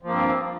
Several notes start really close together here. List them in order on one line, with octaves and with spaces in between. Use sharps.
F3 A#3 G2 C4